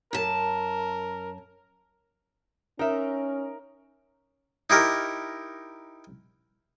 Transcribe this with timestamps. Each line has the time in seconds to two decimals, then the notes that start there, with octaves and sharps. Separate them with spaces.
0.13 F#2 A#4 A5
2.79 C#4 D#4 A#4 E5
4.70 D#4 E4 G4 A#4